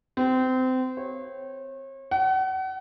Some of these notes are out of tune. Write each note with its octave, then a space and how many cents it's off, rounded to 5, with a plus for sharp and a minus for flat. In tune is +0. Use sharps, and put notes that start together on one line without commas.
C4 -25
C#5 -40
F#5 +35